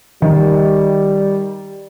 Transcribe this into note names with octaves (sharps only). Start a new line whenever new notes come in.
D#3 G3